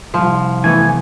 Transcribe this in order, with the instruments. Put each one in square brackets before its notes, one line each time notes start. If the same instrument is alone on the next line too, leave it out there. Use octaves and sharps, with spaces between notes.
[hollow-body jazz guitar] C2 F2 [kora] F3
[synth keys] E3 A3 B3 [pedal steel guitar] G#5